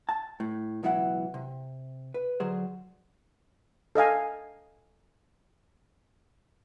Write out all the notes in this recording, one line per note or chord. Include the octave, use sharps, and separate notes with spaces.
A5
A2
C#2 B2 E3 F#3 E4 F#5
C3
B4
D3 F#3 G#4 C5
A4 D#5 F5 G#5